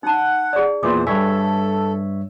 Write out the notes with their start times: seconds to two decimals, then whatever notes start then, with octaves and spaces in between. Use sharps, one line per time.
0.03 D#4 F#5 A5
0.53 G#4 D5
0.83 E2 A#2 E3 C5 D6
1.07 G2 A4 C#5 E5 G#5